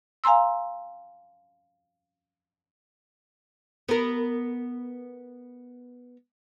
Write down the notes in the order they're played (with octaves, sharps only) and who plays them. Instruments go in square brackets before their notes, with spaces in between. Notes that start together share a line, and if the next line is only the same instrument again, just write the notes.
[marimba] F5 G#5 A#5 C6 E6
[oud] B3 A#4